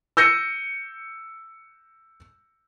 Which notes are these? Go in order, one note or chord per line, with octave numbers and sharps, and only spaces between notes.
E6 G6 A#6 C#7 D#7